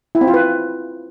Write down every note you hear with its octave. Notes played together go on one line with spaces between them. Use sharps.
E4
C4
F4
B4